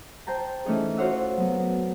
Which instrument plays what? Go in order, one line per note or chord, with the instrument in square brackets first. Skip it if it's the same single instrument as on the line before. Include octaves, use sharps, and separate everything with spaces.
[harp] C5 G5 A5 A#5
E3 A3 C#4 D#4 G#4
F4 F#4 C5 C#5 F#5 E6
F#3 B3
B3